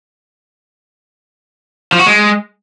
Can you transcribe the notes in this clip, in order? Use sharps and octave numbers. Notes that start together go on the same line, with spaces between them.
F3
F#4
G#3